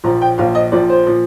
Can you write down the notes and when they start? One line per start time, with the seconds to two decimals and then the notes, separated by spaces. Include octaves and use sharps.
0.04 A#1 A#2 F3 A#5
0.22 G5
0.38 A#1 A#2 F3 F5
0.55 D#5
0.72 A#1 A#2 F3 D5
0.90 C5
1.07 A#2 F3